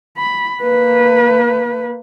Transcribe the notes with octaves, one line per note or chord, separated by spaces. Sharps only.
B5
A#3 B4